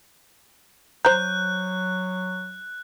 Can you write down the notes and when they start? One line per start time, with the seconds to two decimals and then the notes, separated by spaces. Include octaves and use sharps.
1.05 F#3 C5 A#5 F#6 G6